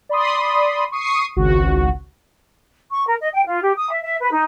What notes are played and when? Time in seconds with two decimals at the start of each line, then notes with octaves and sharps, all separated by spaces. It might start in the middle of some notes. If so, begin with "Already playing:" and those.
0.09 D5 B5 C6 D#6
0.92 C#6 D#6 C7 D#7
1.36 G#1 C#2 F#4
2.89 C#6
3.07 A#4
3.21 D#5
3.33 G5
3.45 F4
3.61 G4
3.75 D#6
3.90 E5
4.02 E5
4.20 B4
4.32 D#4